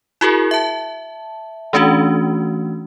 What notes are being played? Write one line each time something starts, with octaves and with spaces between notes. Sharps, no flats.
E4 F#4 G#4 A#4
E5 A5
E3 A3 C#4 D4 F#4